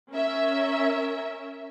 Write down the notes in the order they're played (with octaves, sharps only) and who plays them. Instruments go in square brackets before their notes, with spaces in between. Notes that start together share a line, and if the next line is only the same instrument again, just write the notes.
[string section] C#4 A#4 E5